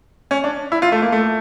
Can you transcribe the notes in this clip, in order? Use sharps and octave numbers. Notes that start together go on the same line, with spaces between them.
C#4
D4
E4
F4
A3
A#3
A3